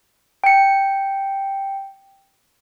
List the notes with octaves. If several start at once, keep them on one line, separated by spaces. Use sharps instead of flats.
G5 C#7